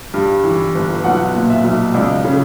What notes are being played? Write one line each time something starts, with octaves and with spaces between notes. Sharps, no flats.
G2
E3
G1
B1 F#5
A#2
E5
B1
C#2 D5
C#3